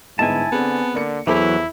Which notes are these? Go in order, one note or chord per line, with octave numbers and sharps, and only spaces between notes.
G1 G#2 B3 E4 D#5 G#5 A5
D3 B3 C4 G#4
D3 A#3 D5 C#7
E2 E3 F#3 E4 A4 C5 D6